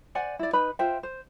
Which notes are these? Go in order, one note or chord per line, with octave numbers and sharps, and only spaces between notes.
C5 D5 F#5 G#5
E4 D5
D#4 B4 B5
F4 C5 E5 G5
C5